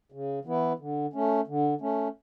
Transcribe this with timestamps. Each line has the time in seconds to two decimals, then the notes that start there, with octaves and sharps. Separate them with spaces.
0.12 C#3
0.45 E3 B3 E4 B4
0.79 D3
1.13 A3 C#4
1.47 D3
1.81 A3 C#4